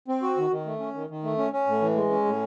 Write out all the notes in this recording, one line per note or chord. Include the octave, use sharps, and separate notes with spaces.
C4
F#4
D#3
D#3
A3
C#4
D#3
D#3
A3
C#4
C#4
A2
E3
G#3
C#4
A2